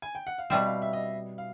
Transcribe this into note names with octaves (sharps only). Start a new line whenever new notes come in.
G#5
G5
F#5
F5
B2 G3 C4 E5
E5
F5
E5
D#5
F5